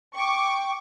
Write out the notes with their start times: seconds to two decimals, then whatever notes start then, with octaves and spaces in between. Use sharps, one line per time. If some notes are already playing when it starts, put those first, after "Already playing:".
0.15 G5 C#6 D6